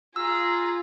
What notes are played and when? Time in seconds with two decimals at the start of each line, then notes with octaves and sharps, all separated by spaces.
0.16 F4 G#4 A#5 E6